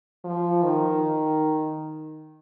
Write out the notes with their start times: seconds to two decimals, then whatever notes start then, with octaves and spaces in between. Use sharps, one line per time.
0.24 F3
0.63 D#3